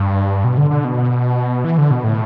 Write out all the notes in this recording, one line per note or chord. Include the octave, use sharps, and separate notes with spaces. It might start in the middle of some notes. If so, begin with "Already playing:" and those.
Already playing: G2
B2
D3
D3
B2
E3
D3
B2
A2